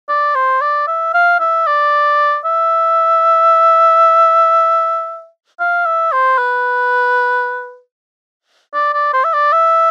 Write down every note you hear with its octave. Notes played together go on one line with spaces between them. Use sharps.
D5
C5
D5
E5
F5
E5
D5
E5
F5
E5
C5
B4
D5
D5
C5
E5
D5
E5